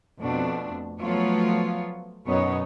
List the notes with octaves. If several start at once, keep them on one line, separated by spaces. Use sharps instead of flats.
F2 B2 A3 D4
F3 F#3 A3 B3 F4 C#5
F#2 B2 B3 D#4 C#5